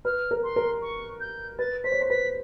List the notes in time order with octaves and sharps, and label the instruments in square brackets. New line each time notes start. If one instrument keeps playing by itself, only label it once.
[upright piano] B4 [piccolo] F6
[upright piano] A#4
[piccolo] C6
[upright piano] A#4
[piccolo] C#6
G6
[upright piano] B4 [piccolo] A6
[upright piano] C5 [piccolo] B6
[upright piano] C#5
C5
[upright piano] B4 [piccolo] B6